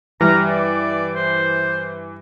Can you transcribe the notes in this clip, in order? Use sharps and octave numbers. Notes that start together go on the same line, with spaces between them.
G2 E3 A#5 F6
D5
C5